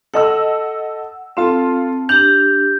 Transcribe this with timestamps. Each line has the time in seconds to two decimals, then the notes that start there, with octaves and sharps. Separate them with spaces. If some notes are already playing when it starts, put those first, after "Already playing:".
0.14 A4 D#5 F#5 E6
1.37 C4 F4 A4 A5 C6
2.09 D4 G4 G6 F7